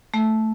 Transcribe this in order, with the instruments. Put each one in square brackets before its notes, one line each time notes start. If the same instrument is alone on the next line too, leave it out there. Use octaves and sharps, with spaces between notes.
[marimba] A3